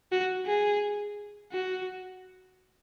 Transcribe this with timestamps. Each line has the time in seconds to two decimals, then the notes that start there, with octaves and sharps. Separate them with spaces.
0.12 F#4
0.47 G#4
1.52 F#4